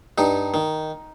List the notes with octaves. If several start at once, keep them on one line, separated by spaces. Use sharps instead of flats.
G2 D#4
D#3